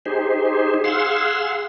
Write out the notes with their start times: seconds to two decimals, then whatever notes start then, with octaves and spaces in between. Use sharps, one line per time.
0.06 D#4 G4 G#4 C5
0.84 G#4 F5 F#5 C6 E6